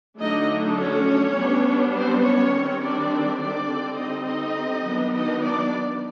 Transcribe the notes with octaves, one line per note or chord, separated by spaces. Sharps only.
D3 F#3 A3 D4 D#4 D#5
C#4 C#5
G3 B3 D4
C4 C5
C#4 C#5
D#3 G3 C4
D4 D5
D4 D5
D3 G3 C4
D#4 D#5
D#4 D#5
D#3 F#3 B3 D4
D#4 D#5
D4 D5